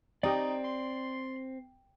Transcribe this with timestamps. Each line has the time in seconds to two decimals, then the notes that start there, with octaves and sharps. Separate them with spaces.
0.23 C4 D#4 G4 D5 D#5
0.64 C6